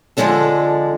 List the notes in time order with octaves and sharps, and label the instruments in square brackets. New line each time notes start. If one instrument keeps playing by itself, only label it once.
[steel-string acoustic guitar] F2 D3 F3 G#3 D4 A4